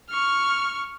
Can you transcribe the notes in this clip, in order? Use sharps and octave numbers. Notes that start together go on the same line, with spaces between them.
C#6 F6